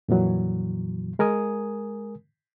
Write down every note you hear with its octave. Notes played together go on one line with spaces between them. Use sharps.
F2 A#2 E3 F#3
G#3 A#4 G#5 D#6